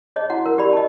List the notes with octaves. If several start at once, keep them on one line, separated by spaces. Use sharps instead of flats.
G#4 C#5 D#5 A5
E4 F#4 F#5
A#4
G4 D5 B5
D#5 A5